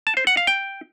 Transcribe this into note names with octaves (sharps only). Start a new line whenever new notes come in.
A5
C5
F#5
F5
G5